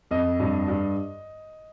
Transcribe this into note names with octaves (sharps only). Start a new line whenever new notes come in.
F2 D#5
G2
G2